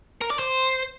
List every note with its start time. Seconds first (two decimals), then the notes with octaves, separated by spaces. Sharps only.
0.21 A#4
0.30 D5
0.39 C5